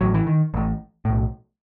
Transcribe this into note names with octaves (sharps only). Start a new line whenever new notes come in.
A1 A2 F#3
E3
D#3
A1 A2
B1 A2